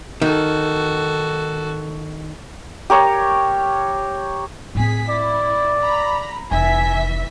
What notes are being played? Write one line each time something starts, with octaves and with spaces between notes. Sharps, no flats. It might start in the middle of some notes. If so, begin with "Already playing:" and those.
D#3 F#4 A4
G4 A#4 C#5
A2 C4 G#4 B6
E4 D5
A#5 B5
F1 E3 E5 G#5 B6